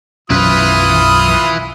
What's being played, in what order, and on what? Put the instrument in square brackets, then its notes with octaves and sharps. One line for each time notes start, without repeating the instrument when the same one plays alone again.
[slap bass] B1 F#2 C#4 [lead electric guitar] E4 B4 [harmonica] F4 D#6